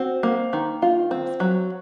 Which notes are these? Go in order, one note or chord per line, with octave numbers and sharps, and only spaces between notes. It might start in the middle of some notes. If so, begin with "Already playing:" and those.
Already playing: C4 F#4
A#3
D#3
F4
C4
F#3